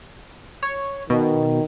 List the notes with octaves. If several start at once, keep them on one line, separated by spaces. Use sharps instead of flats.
C#5
B2 D#3